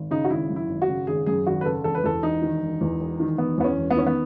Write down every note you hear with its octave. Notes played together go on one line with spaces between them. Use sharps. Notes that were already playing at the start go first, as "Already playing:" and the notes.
Already playing: G#1
C#3 D#4
F#4
G#1 E4
F#2
E4
G#1
F#4
C#3
G#1 G#4
F#2 G#4
G#1 F#4
B4
C#3 A4
E1 A4
B4
E2 A4
E1 D#4
D#3
E1
E2
E1
D#3
E1 B3
E2 B3
C#4
E1
B3
D#3 C#4
B3